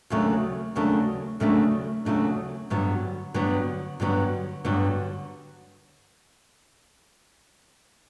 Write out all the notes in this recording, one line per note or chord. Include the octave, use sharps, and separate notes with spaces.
D#2 C#3 F#3 A3 D4
D#2 C#3 F#3 A3 D4
D#2 C#3 F#3 A3 D4
D#2 C#3 F#3 A3 D4
G2 D3 F#3 B3
G2 D3 F#3 B3
G2 D3 F#3 B3
G2 D3 F#3 B3